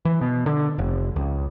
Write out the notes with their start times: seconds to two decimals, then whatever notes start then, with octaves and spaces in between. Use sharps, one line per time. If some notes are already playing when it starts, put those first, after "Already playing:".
0.05 E3
0.21 B2
0.46 D3
0.78 F1
1.16 C#2